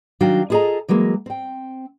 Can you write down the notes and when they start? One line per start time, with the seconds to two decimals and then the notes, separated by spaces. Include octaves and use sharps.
0.20 D#3 F#3 D4 F#4 F5 G5
0.50 E4 F4 G#4 A4 D#5 A#5
0.88 E3 F#3 G#3 A#3
1.26 C4 G5